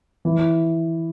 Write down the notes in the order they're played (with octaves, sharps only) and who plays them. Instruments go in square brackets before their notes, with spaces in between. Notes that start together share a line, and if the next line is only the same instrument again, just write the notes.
[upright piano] E3